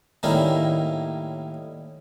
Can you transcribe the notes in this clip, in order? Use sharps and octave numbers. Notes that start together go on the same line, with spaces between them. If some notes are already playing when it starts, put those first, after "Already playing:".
A2 D#3 G3 A#3 C#4 E4